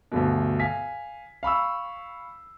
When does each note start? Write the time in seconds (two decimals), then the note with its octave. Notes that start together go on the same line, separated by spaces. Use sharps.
0.12 D2 G2 B2
0.60 F5 G#5 B6
1.43 F5 B5 C#6 E6